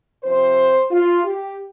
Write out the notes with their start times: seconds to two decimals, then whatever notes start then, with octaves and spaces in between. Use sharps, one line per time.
0.23 C3 F3 C4 C5
0.91 F4
1.24 G4